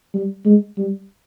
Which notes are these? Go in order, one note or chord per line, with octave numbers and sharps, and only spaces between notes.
G3
G#3
G3